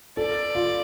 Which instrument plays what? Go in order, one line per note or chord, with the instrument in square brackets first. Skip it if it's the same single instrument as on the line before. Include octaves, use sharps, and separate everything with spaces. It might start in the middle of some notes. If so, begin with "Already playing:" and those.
[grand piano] A4 [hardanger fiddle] D5
[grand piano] F4